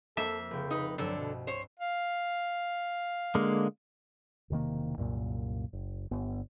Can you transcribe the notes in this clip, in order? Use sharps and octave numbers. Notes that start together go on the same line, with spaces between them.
F2 A#3 A4 E5
F1 C#3 G5
D#4 B4
C2 G2 D3 F#3 A4
B2
C5 C#5
F5
D3 G#3 A#3
E1 C3 D#3 A#3
C2 F#2 A#2
F#1
G1 B3